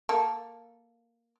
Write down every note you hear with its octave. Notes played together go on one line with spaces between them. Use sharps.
A#3 A4